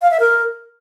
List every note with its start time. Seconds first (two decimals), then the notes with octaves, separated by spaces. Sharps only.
0.02 F5
0.11 E5
0.20 A#4